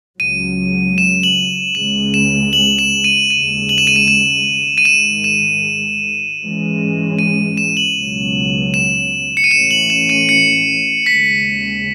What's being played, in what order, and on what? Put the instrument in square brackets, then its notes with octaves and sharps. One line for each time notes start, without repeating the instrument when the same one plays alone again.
[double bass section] C#2 C#3 F#3 [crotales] D#7
[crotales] E7
F#7
[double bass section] C#2 C#3 G#3 [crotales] E7
[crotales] E7
F#7
E7
D#7
[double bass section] D#2 C#3 G#3 [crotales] D#7
[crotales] F#7
E7
D#7
E7
E7
D#7
[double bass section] G#2 D#3 G#3 [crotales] E7
[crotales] E7
[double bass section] G#2 E3 G#3 C#4
[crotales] D#7
E7
F#7
[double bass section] C#2 B2 F#3
[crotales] E7
C#7
D#7
[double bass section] A2 E3 A3 C#4 [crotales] E7
[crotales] F#7
E7
D#7
C#7
[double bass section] D#2 C#3 G#3 [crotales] B6